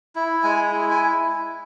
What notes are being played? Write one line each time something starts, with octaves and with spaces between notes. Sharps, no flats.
E4
G#3 G#5
E4
G#5